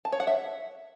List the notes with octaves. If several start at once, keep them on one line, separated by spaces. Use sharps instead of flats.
A5
C#5
F#5
E5